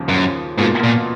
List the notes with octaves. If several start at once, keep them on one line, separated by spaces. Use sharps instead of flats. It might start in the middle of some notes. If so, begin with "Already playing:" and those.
Already playing: D#2 C#3 F3 A#3
F#2
G#2 B2 A#3 F4
A#2